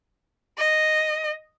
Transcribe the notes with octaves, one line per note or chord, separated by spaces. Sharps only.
D#5